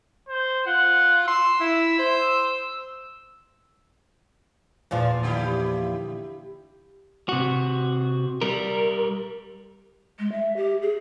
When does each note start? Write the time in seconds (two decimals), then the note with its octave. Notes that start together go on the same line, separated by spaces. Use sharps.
0.29 C5
0.67 F4 F#5
1.28 C6 E6
1.60 E4
1.99 C5
4.91 E2 A#2 F3
5.23 D3 E4 G4
7.29 C3 F#4
8.42 G3 A#4
10.19 G#3
10.32 E5
10.57 G4
10.82 G#4